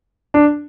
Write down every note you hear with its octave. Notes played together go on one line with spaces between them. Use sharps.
D4